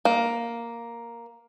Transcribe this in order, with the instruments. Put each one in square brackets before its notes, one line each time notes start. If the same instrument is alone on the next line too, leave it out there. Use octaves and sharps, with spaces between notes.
[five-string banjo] A#3